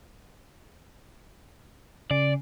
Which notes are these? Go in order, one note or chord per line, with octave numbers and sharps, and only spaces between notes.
C#3 D5